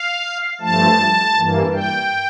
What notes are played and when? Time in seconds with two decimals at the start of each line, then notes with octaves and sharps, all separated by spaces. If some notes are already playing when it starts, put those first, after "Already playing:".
Already playing: F5
0.61 G2 F3 A3 A5
1.36 G2 E3 A#3
1.74 G5